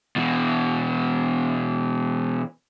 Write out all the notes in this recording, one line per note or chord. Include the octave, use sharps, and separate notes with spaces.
B2 E3